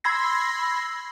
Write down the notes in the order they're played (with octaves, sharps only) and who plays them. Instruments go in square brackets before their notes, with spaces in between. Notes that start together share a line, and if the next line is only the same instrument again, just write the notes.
[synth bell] B5 C6 E6 G#6 A#6 C7